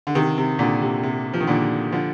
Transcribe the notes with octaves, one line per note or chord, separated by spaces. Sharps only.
D3
C3 D#3
C3
A#2 D3
C3
C3
F3
D#3
A#2 D3
D3 F3